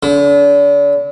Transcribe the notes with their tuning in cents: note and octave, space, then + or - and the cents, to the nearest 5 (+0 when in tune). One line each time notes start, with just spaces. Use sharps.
D3 -40